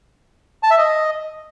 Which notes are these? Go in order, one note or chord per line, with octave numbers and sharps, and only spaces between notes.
A5
E5
D#5